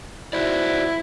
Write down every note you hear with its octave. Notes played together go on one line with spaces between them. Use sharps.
E4 F#4 C5 D5